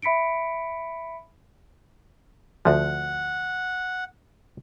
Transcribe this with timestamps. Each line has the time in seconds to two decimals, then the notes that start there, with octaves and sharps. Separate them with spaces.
0.02 E5 B5 B6 C#7 D7
2.65 D2 F3 F#5